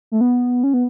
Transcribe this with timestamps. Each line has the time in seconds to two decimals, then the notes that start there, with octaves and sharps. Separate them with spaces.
0.12 A3
0.21 B3
0.64 C#4
0.74 B3